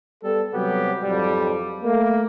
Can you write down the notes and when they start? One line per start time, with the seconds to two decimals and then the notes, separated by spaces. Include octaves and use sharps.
0.24 G3 B3 A4
0.54 C3 F#3 G3 B3 G4
1.04 F2 G#2 F#3 G3
1.83 A3 A#3